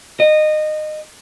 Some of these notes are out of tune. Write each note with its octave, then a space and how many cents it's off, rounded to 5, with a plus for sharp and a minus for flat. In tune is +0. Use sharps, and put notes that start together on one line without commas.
D#5 -20